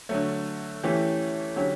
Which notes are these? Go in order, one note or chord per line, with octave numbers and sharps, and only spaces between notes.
D3 F#3 A3
E3 A3 C#4 E4 G4
D3 F#3 C#4 G4